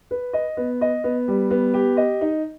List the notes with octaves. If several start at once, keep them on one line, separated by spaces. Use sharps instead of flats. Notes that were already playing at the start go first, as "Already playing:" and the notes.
B4
D#5
B3
D#5
B3
G3
B3
G4
D#5
D#4